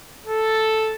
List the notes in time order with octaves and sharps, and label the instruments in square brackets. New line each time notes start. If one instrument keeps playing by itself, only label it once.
[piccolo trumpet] A4